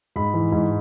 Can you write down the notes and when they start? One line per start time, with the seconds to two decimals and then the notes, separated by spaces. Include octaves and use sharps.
0.16 G#2 B5
0.34 E3
0.52 G#2